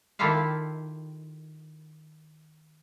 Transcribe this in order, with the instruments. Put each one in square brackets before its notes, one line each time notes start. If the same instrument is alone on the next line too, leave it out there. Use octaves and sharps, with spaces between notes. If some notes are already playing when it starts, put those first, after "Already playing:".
[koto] D#3 E4 F4 G4 A4 F5